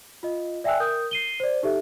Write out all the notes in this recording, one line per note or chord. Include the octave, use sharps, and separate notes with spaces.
F4 D#5
D5 E5 G5 G#5 E6 F#6
A#4 D#6 G6
C7 D#7 G7
C5 D5
D#4 G4 A4 E5